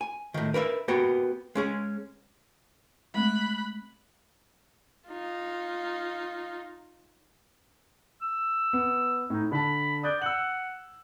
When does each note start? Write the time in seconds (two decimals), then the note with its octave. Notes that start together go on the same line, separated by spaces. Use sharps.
0.01 G#5
0.34 A2 D#3
0.54 A#4 B4 D5 E5
0.88 A#3 B3 F#4 G4
1.55 G#3 C#4 G#4
3.14 G#3 A3 C4 B5 F#6
5.09 D#4 F4
8.21 E6
8.73 B3
9.30 A2 D#4
9.52 D3 A5 B5
10.03 D5 D#6 F#6 G6
10.22 F#5 E6 F#7